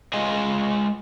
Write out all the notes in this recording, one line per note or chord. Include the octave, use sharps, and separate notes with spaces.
G#3 F4 G#4 D#5 F5 G#5